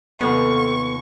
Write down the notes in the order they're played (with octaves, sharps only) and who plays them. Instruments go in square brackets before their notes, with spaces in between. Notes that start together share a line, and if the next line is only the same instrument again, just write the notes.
[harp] D#2 C3 F4 [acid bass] B3 [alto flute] A4 [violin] C#6